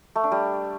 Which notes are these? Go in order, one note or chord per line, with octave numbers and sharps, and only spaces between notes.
A3
D4
G3